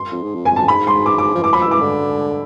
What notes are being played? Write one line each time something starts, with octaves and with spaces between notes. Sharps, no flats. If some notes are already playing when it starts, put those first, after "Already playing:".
Already playing: C6
F2
G#2
F2
G#5
A5
G#2 B5
C6
D6
D6
F3
E3 D6
F3 B5
E6
E3 D6
D3